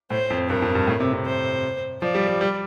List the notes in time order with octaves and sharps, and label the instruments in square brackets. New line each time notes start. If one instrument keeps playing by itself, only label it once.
[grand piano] A2 [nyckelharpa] C5
[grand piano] F2
[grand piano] G2 [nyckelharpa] A#4
[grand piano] F2
G2
A2
C3
C3
[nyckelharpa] C5
[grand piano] F3 [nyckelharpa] D5
[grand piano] G3
G3
G3